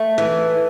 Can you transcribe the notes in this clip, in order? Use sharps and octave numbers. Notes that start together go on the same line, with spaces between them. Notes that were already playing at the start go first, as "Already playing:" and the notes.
Already playing: A3
E3